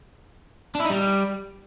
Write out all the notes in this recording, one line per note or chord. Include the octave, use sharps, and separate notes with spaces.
D4
E4
D#4
G3